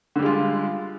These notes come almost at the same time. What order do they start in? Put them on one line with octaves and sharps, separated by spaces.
D3 G3 G#3 F4